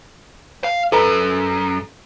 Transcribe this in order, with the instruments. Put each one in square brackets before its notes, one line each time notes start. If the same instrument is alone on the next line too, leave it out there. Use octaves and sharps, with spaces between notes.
[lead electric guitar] F5
[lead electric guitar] F#2 [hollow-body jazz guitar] A4 B4 A#5